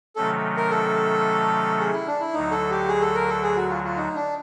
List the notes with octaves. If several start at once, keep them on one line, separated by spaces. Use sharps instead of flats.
C3 D#3 F#3 A3 C#4 A4
A#4
A4
G#4
E4
D4
E4
D2 D3 F#3 D#4
A4
G4
G#4
A4
A#4
A4
G#4
F#4
F4
F4
D#4
D4